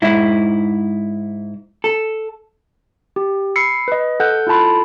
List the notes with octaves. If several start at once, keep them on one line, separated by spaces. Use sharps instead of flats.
G#2 E4
A4
G4
B5 E6 C7 C#7
B4 D#5
A4 F#5 F#6 G6
E4 F4 A4 A5 B5 C6